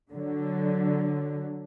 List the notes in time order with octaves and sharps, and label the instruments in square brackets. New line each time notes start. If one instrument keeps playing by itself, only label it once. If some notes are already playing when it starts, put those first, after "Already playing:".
[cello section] D3 F#3